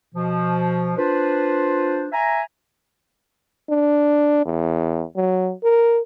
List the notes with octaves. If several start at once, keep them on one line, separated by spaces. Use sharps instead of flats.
B2 F3
D4 F4 B4 C5
E5 G#5 A#5
D4
E2
F#3
A#4